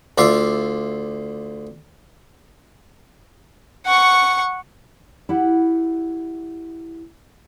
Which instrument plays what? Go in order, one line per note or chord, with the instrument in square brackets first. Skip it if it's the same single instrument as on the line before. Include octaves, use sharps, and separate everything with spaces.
[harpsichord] D2 F4 D5 E5 F5
[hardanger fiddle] F#5 C#6
[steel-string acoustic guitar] E4 G4 F#5